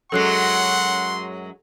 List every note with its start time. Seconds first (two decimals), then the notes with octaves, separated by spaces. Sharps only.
0.12 F#2 F#3 G#3 A4 F#5 C6 F#6 C7